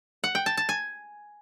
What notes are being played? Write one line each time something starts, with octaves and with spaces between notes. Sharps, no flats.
F#5
G5
A5
A5
G#5